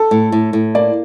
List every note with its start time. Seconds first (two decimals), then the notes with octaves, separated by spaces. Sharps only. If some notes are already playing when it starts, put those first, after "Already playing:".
Already playing: A4
0.11 A2
0.32 A2
0.53 A2
0.75 A#3 D5